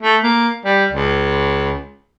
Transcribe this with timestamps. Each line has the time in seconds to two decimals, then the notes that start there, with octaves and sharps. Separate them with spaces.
0.02 A3
0.23 A#3
0.65 G3
0.91 C#2